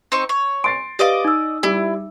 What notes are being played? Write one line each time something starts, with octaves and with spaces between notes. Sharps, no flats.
C4 D#4 C#6
C#5
C6 A6 C7 D7
G4 B4 D5 D#5 F5 D6
D#4 E6
G3 E4